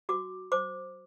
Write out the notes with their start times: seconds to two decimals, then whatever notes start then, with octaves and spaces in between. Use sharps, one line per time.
0.09 F#4 D6
0.52 C5 D6